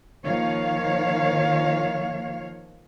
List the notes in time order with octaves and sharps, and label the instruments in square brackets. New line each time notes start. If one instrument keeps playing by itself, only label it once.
[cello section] D#3 F3 A#3 C#5 F5